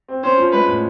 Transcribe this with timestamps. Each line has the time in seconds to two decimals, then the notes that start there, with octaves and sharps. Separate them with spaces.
0.08 C4
0.23 C#4 C5
0.37 F3
0.53 G#3 B4
0.68 A2